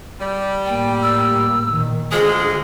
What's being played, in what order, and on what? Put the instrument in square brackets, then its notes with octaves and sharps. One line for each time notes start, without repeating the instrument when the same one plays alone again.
[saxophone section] G3
[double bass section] A2 A#3 [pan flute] G5
[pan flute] E6
[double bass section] A#2 D#3
[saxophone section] D2 F3 G#3 [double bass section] D3 [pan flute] G#4